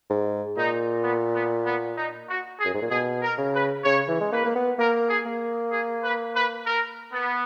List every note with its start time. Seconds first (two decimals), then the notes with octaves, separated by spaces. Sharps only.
0.10 G#2
0.56 A#2 D#4
1.04 B3
1.35 B3
1.66 B3
1.98 D#4
2.29 F#4
2.59 G#4
2.65 F#2
2.74 G#2
2.82 A#2
2.90 B2 G#4
3.22 A#4
3.38 C#3
3.54 B4
3.84 C#3 C#5
4.08 E3
4.20 G#3
4.32 A#3 B4
4.45 A#3
4.55 B3
4.78 A#3 A#4
5.10 G#4
5.25 A#3
5.72 G#4
6.03 B4
6.35 B4
6.67 A#4
7.13 B3